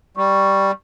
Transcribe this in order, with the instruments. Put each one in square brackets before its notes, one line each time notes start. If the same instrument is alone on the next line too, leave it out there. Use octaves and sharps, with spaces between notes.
[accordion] G3 [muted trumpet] C#6